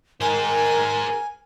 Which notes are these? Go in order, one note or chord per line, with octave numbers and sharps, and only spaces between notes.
D#3 G#4 A#4 C5 G#5